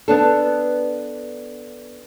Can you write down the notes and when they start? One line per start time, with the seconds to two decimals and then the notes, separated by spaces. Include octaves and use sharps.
0.08 B3 D4 A4